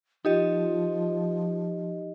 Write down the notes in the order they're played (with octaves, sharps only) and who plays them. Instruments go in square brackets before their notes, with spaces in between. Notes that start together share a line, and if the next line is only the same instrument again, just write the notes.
[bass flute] F3 [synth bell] D#4 G4 D#5 [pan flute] F4